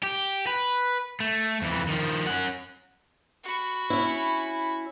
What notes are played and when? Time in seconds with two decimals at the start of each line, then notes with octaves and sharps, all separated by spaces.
0.03 G4
0.47 B4
1.20 A3
1.62 F2 E3
1.88 D#3 F3
2.27 C#4 F#5
3.44 F#4 B5
3.90 C#4 E4